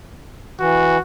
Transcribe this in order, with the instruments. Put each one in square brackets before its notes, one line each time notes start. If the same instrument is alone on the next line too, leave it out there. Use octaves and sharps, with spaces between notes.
[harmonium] E3 [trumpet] F#4